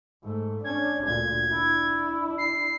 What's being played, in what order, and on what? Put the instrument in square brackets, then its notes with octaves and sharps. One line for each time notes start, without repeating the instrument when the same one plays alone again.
[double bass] G#2 A3
[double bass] C#4 D4 [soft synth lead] G#6
[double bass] D2 A#2 [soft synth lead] G#6
[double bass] D4 E4
[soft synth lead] C7